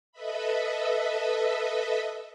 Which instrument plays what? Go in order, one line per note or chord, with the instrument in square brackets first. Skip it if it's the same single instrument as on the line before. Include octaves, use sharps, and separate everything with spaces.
[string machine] A4 B4 D#5 E5 B5